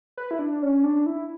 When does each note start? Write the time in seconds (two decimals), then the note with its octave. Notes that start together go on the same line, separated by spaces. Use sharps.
0.17 B4
0.31 E4
0.39 D4
0.62 C#4
0.83 D4
1.06 E4